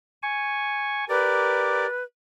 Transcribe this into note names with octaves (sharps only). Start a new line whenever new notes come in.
G#5 C#6
G4 A#4 B4 D5